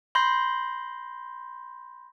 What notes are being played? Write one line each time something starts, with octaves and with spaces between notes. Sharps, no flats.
B5 C6 G6 A#6